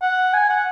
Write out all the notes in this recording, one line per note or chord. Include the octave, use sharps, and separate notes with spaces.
F#5
G#5
F#5